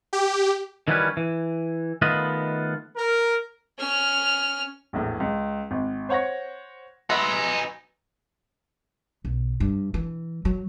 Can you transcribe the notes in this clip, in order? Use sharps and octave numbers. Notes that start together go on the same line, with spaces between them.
G4
D#3 E3 F#3 G3 C#4 B4
E3
D#3 A3 B3 F4 B4 D#5
A#4
C#4 F6
A#1 E2 A2
C#2
G#1
C5 C#5 F#5 C#6 A#6
F#3 B3 D#4 E5 G#5 C6
B1
G2
E3
F#3